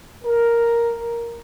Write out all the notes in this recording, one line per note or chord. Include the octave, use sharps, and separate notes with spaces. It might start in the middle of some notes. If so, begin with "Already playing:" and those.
A#4